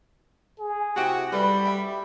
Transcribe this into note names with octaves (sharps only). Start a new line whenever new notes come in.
G#4
C3 E4 F#4 G4 G5
G3 A4 B4 B5
E5 G5